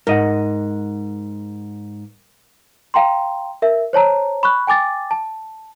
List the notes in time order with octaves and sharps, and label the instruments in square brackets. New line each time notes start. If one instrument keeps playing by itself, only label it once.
[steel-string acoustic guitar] G#2 [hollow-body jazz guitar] A#4 D#5 F#5
[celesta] F5 G5 A#5 C6
A#4 E5
C5 C#5 A5 A#5
B5 C#6 F#6
G5 G#5 D6 A6
A5